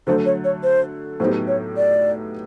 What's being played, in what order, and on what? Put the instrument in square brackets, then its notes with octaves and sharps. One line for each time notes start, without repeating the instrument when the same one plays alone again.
[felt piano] D3 F#3 A3 [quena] C5
[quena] C#5
C#5
C5
[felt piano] A2 F#3 B3 D#4 G4 [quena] C5
[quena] C#5
D5